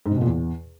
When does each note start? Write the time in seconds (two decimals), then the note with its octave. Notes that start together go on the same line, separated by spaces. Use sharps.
0.06 G#2
0.11 C3
0.16 B2
0.21 A#2
0.26 E2